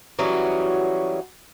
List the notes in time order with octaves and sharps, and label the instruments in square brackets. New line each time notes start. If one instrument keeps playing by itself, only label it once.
[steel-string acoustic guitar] E3 F#3 G3 C#4 F#4 G#4